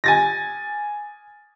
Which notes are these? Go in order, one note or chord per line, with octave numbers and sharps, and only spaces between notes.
G#5 A6 A#6